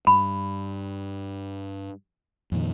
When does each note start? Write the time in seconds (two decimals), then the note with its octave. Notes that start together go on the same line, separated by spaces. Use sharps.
0.07 G2 B5
2.52 F2 A#2 D#3